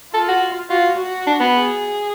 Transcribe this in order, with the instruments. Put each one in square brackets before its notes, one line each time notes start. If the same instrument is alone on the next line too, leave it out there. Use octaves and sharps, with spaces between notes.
[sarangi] F4 [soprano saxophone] A4
[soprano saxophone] F#4
[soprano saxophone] F4 [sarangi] F#4
[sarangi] F#4
[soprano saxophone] D4
B3
[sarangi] G#4